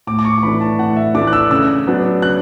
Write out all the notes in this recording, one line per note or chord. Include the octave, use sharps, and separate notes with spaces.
A2 D6
D6
C#6
C#6
E3 A3 D4 B5
A5
A2 F#5
E5
E3 A3 D4 D6
F#6
E6
C#3 E6
F#3 B3 D4
C#3 F#6